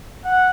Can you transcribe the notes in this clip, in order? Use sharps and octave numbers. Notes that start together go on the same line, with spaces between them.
F#5